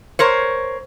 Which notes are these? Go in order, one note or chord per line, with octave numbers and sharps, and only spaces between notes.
A#4 C5 C#5